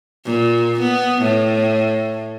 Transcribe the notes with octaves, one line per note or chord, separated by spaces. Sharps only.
A#2
B3
A2